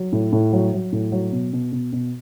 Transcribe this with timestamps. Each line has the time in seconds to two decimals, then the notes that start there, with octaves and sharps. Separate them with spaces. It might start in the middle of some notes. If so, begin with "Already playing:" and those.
Already playing: F#3
0.12 A2
0.32 A2
0.53 F#3
0.73 F#3
0.92 A2
1.12 F#3
1.32 B2
1.53 B2
1.72 B2
1.93 B2